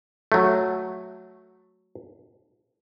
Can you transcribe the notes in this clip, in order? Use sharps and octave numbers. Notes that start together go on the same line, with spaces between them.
F#3 A3